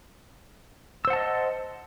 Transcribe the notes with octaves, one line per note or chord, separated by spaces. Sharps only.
C5 D#5 F#5 A5 E6